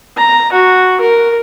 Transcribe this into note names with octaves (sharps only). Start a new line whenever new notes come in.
A#5
F#4
A#4